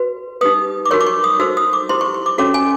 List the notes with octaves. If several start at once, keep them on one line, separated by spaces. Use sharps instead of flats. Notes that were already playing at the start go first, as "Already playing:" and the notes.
Already playing: F#4 B4
D#4 G4 B4 D#6
D6
D#4 F#4 A#4 C#5 C#6
D6
C#6
D#6
D#4 F#4 A4 C5 E6
D#6
D6
E4 G4 C5 C6
C#6
C#6
D6
C#4 F#4 A4 C#5 D6
G#5